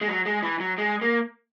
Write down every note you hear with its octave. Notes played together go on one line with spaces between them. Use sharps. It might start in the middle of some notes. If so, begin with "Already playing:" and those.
G#3
F#3
G#3
E3
F#3
G#3
A#3